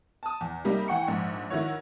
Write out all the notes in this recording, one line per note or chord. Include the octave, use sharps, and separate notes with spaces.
A5 D#6
E2
C3 G3 A#3 D#4
E3 F#5 G5 C#6 C#7
A#1 G#2
D#3 E4 F#4 C#5